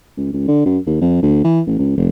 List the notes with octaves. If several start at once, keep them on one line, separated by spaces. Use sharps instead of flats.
C#2
C#2
D3
F#2
D#2
F2
D2
E3
A1
C#2
F1